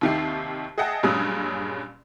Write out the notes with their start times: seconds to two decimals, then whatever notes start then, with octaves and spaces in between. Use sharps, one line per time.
0.01 D#2 C3 D#3 G4 E5 C7
0.78 G#4 D#5 E5 F#5 G5 A5
1.03 G2 A#2 F#3 G#3 C#4 D#6